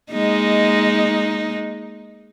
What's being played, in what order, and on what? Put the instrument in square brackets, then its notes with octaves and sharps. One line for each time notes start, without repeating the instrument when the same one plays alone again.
[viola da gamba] G#3 A#3 D#4